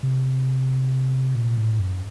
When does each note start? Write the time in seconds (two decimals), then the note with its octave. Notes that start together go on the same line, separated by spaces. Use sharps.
0.03 C3
1.35 A#2
1.57 A2
1.79 F#2